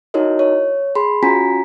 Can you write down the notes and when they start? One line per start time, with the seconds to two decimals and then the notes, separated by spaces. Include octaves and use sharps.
0.14 D#4 E4 F#4 A#4 C#5 D#5
0.39 C#5
0.95 G#4 B5 C6
1.23 C#4 F4 F#4 G#5 A#5 B6